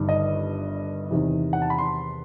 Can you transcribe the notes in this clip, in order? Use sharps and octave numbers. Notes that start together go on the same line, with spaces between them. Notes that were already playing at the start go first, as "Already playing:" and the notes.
Already playing: G1 G2 D#3
D#5
E2 C3 D#3
F#5
A5
B5
C6